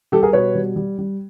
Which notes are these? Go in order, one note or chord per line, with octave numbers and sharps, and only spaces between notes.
G3 G4 A4
G#4 A#4
B2 B4 C#5
G3
G3
G3